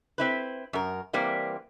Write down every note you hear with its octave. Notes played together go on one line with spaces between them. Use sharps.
C4 E4 B4
F#2 A#4
E3 G3 A#3 C4